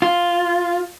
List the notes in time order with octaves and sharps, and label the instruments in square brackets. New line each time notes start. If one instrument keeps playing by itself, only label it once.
[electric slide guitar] F4